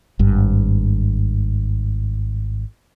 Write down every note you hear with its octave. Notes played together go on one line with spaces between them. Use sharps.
G#1 G2